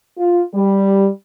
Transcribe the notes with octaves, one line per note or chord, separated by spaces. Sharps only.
F4
G3